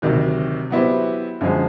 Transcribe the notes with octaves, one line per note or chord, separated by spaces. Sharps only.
D2 C3 D#3 F#3
F#3 B3 E4 G4 C5
F#2 D3 F3 G#3